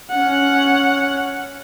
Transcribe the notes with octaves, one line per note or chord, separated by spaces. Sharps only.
C#4 F#5